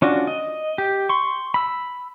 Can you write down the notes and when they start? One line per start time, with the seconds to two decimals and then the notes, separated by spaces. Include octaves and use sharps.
0.02 C#4 D4 F4 F#4
0.27 D#5
0.78 G4
1.09 C6 C#6
1.54 B5 E6